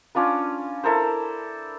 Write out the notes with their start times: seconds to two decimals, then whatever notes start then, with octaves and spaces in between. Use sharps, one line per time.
0.15 C#4 D4 F4 B4
0.84 E4 A4 A#4 C5